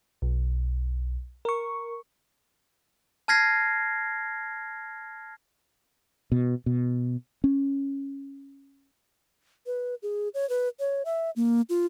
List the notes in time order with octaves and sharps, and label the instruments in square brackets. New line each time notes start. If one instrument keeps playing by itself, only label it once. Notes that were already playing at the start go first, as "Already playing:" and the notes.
[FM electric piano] B1
A#4 C#6
[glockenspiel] A5 F6 G#6 A#6 C7
[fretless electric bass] B2
B2
C#4
[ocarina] B4
G#4
C#5
B4
C#5
E5
A#3
F4